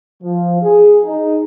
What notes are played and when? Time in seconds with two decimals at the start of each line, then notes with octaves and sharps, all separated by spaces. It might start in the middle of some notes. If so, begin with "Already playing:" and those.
0.23 F3
0.62 G#4
1.04 D#4